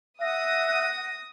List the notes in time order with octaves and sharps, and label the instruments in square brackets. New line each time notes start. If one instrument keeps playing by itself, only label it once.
[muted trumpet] E5 [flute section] F#5 F#6 [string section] D#6 [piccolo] A#6